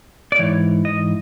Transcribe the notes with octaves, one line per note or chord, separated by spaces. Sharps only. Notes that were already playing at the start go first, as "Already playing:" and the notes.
D5
G#2 E3 C#5
D#5